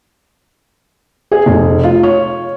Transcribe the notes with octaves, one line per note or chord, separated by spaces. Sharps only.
G#4
F1
F4
C#5